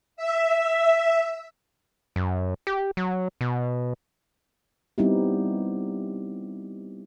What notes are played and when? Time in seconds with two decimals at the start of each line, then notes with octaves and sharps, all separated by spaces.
0.17 E5
2.16 F#2
2.67 G4
2.97 F#3
3.41 B2
4.98 G3 B3 C4 D#4 E4 G4